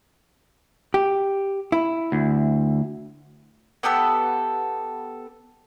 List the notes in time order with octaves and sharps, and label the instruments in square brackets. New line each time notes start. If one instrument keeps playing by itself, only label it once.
[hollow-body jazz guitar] G4
E4
[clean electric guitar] D2
[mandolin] B3 G4 A4 E6